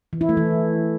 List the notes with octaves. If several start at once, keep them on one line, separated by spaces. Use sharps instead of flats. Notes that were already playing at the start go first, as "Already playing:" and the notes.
E3
E4
A3
E3